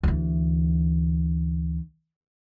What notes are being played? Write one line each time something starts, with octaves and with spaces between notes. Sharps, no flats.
D2 E3